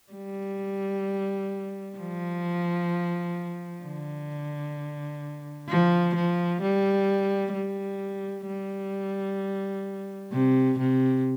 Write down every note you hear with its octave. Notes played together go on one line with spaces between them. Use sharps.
G3
F3
D3
F3
F3
G3
G3
G3
C3
C3